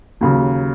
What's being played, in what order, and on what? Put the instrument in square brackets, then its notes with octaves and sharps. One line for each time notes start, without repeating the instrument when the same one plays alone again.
[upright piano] D#2 C#3 F#3